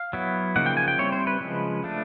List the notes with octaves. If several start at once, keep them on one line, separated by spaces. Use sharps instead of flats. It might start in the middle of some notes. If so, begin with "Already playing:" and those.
Already playing: F5
F#3 B3 E4
C#3 F3 A#3 D#4 F#5
G5
G#5
G5
G3 C4 E4 C#5
C5
B4
C#3 F3 G#3
F3 A3 D4